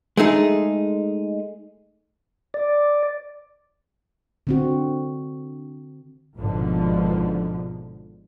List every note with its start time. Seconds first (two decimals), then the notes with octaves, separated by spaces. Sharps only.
0.17 G#3 A3 D#4 G#4
2.54 D5
4.47 D3 C4 F#4
6.36 G#1 G#2 B2 D3 F3